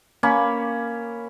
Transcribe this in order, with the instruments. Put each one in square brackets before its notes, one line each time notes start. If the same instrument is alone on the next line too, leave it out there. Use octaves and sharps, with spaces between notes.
[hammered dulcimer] A#3 C#4 B5